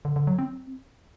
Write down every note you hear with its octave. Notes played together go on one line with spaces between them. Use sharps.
D3
D3
F#3
C4